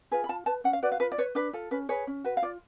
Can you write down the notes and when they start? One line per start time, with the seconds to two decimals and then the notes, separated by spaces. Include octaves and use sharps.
0.11 F4 G#4 B4
0.24 B5
0.29 F4 A5
0.46 B4 A5
0.64 C#4 F#5
0.73 F5
0.83 F#4 B4 D5
0.92 F5
1.00 F4 B4
1.12 D5
1.18 B4 C#5
1.35 D4 B4
1.53 F4 A4
1.71 C#4 B4
1.89 G#4 B4 C#5
2.07 C#4
2.24 F#4 B4
2.37 F5
2.42 F4 D5